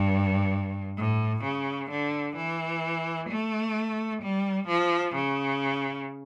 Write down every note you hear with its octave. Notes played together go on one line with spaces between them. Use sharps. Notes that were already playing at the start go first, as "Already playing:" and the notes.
Already playing: G2
A2
C#3
D3
E3
A3
G3
F3
C#3